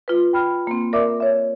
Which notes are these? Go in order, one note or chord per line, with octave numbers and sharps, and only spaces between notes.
F4 B4
G5 B5 F6
A#3 C4
A#4 D5 E5 D6
C#5 E5